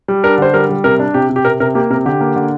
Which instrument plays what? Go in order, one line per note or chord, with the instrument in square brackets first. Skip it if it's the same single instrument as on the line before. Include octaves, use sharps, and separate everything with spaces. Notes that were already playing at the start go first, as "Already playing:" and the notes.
[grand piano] G3
D4 A#4
D3 C5
G3 A#4
G3
C3 A#4
D4
C3 G4
C3
G4
C3 A#4
C3 A#4
A#3 G4
C3 A#4
D3 G4
A#3
D3